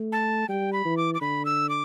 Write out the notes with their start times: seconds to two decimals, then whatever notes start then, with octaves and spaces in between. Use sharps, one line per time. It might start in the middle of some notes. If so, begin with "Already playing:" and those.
Already playing: A3
0.12 A5
0.49 G3 G5
0.73 B5
0.85 E3
0.97 D6
1.14 D6
1.21 D3 B5
1.45 E6
1.69 D6